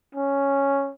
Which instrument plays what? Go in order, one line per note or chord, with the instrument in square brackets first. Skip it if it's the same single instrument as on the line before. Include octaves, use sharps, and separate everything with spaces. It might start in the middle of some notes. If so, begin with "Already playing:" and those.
[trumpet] C#4